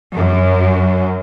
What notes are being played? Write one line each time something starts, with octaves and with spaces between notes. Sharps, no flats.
F#2